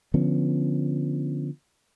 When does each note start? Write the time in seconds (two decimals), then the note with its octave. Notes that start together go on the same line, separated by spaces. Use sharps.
0.14 D3 F3 B3 C#4